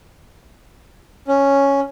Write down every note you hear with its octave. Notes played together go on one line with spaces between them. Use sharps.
C#4